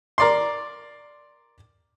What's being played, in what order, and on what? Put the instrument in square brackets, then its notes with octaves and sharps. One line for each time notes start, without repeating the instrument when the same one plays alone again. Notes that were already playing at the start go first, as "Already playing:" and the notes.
[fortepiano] A#4 D5 C6